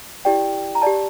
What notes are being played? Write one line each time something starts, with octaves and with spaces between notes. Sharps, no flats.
E4 G4 D5 G5
A#5
G4 D5 A5